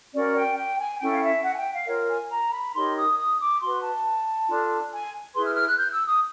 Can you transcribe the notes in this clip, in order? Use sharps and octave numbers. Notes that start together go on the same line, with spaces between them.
C#4 F#4 A#4 D5
G5
G5
G#5
C#4 E4 A4 G5
F5
E5
F#5
G#5
G5
F5
F4 A#4 C#5
G#5
A#5
B5
D#4 G4 A#4 C#5 C6
D#6
D#6
D6
F#4 B4 C6
A5
D4 F4 A4
G#5
E4 G#4 B4 C6
F6
F6
F#6
G6
E6
D#6